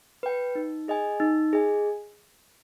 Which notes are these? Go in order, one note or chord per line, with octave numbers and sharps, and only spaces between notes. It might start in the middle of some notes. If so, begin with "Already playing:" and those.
B4 G5
D#4
G#4 D#5 G#5
D#4
G#4 D#5 G#5